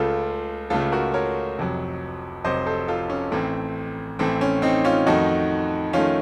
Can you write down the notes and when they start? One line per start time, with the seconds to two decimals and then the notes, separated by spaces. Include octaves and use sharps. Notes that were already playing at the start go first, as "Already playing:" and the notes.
Already playing: C#2 C#3 A3 F4 A4
0.70 C#2 C#3 A3 F4 A4
0.92 F#4 A#4
1.14 A#4 C#5
1.58 F1 F2 C3 F#3
2.44 F1 F2 C3 F#3 C5 D#5
2.66 A4 C5
2.88 F4 A4
3.10 C#4
3.32 A1 A2 A3 C4
4.19 A1 A2 A3 C4
4.41 C#4
4.62 C4 D#4
4.85 C#4 F4
5.07 F2 D#3 A3 D#4 F#4
5.93 F2 D#3 A3 C#4 F4